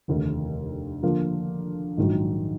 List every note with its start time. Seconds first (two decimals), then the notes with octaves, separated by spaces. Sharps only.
0.08 F1 D#2 D3
1.03 D3 F3 A#3 F4
1.97 A#1 G#2 D#3 F#3